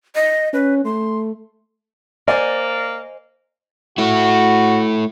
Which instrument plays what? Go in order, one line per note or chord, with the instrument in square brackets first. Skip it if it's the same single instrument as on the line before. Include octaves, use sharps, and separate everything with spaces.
[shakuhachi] D#5
[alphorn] C#4 [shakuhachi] B4
[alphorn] A3 [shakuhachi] C6
[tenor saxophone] A#3 [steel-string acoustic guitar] C5 D#5 G#5 [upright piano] D5
[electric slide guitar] A3 E4 [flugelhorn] F#4